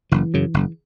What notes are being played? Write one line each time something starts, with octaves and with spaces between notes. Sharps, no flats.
F#1 E3
F#2 C#3
F#1